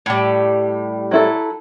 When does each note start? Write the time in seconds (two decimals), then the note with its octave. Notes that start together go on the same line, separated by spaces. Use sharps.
0.06 A2 G3
1.11 F#3 E4 A4